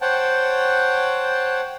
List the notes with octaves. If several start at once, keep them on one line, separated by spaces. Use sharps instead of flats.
C5 C#5 F#5 G5 A5